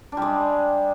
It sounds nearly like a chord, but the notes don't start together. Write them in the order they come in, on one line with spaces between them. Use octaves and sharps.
D4 G3 G#3